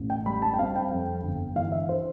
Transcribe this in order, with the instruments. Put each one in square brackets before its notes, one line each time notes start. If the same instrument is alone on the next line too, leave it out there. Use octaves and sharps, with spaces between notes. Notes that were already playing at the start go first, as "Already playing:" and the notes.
Already playing: [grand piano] A1
G5
G3 B5
A5
G5
C4 F5
G5
F2
G1
E3 F5
E5
C5